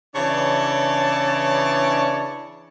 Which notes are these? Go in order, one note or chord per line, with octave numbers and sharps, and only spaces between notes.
C#3 E3 D4 C#5 D5 A5